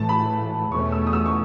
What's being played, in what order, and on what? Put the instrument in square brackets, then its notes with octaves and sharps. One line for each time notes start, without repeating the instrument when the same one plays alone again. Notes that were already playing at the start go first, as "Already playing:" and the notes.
Already playing: [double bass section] A2 E3 A3 [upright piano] A5
[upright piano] B5
[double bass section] E2 B2 A3 C#4 [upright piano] C#6
[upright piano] E6
D#6
E6
C#6